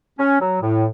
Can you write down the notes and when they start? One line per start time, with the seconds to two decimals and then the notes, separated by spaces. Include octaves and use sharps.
0.19 C#4
0.40 F#3
0.62 A2